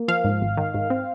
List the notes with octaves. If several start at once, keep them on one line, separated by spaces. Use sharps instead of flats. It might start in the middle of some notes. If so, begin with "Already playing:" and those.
Already playing: A#3
F3 F5
G#2
G#1
D#3
G#2
C4